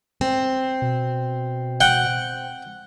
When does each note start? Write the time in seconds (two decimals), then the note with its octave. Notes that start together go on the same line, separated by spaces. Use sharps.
0.21 C4
0.82 B2
1.81 F#5 G5